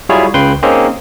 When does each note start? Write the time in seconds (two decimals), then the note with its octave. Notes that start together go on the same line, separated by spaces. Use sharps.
0.09 F#3 G3 E4 F4 G#4 C#5
0.34 C#2 C#3 B4 G5 C6
0.63 A#3 C4 C#4 D#4 G#4